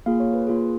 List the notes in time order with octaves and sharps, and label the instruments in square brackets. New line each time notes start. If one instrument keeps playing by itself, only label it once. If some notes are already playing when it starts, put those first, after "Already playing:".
[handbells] A#3 F4 G#4 F5
C#5
B4
A#3 F4 G#4